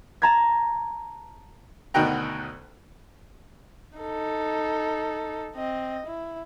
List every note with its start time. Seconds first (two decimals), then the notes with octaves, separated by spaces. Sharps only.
0.22 A5 A#5 G#6
1.94 D2 B2 D#3 F#4 G5 A#5
3.99 D#4 A4
5.55 C4 D#5
6.07 E4